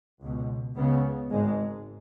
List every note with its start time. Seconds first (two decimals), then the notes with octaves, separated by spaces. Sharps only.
0.21 C#2 B2
0.76 C#2 C#3 B3
1.30 G#1 G#2 G#3